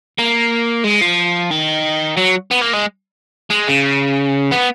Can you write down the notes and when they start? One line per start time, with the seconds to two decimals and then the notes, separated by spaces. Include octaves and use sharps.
0.19 A#3
0.85 G#3
1.02 F3
1.51 D#3
2.17 F#3
2.51 B3
2.62 A#3
2.74 G#3
3.51 G#3
3.68 C#3
4.51 B3